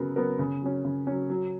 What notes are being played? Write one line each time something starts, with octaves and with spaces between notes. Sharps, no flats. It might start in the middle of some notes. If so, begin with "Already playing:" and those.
Already playing: C#3 F#3 B3 F#4 A#4
F#3 B3 F#4 A#4
C#3
F#3 C#4
C#3
F#3 C#4
F#3